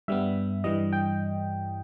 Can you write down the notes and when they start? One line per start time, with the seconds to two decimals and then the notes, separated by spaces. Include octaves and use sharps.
0.08 G2 G3 B3 E5
0.64 G2 E3 G3 D#5
0.93 G5